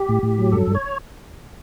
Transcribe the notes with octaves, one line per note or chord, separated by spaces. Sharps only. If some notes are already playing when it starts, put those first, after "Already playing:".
Already playing: G4
A2
A2
F#3
G2 A4
G2
C#5